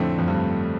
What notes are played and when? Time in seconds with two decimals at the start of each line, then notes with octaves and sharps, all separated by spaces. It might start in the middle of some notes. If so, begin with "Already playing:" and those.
Already playing: F2 A2 D3 A3 C4
0.18 F2
0.28 G2